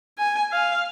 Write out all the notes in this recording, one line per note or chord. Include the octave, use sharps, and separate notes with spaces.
G#5
F5